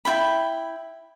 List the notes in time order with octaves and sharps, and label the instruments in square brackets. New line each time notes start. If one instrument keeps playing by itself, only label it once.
[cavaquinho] E4 F4 G5 B5